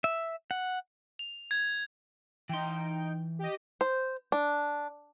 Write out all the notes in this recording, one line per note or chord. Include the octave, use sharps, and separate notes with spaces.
E5
F#5
F7
G#6
E3 D#4 G5 C6
G4 D#5
C5
D4